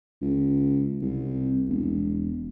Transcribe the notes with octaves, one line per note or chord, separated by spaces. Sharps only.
C#2
C2
E1